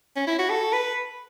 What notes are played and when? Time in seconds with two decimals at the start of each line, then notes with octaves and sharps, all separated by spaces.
0.16 C#4
0.27 E4
0.39 F#4
0.50 A4
0.73 B4